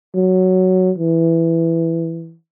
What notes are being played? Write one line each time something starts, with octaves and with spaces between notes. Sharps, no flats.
F#3
E3